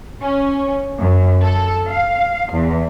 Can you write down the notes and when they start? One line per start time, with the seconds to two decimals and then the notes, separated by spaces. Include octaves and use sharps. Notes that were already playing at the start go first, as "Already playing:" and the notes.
0.21 C#4
1.01 F#2
1.41 A4
1.90 F5
2.52 E2